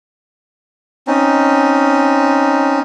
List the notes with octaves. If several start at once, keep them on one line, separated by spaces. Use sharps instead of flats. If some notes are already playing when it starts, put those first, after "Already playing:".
C4 C#4 D#4